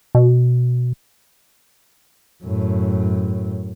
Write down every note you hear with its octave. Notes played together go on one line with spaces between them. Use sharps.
B2
F#2 A2